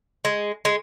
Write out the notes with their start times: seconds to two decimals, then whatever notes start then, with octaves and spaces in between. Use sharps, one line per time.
0.25 G#3
0.65 G#3